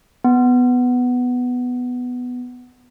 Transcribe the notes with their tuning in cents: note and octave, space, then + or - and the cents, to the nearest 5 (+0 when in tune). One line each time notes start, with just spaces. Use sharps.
B3 +5